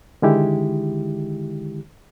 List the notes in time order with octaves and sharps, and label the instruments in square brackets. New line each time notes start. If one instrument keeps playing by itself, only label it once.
[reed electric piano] D3 D#3 G#3 E4 G4